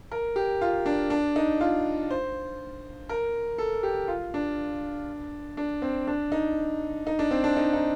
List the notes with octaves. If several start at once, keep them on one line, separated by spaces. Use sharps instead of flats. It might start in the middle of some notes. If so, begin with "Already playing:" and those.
A#4
G4
F4
D4
D4
D#4
F4
C5
A#4
A4
G4
F4
D4
D4
C4
D4
D#4
D#4
D4
C4
D4
D#4
D#4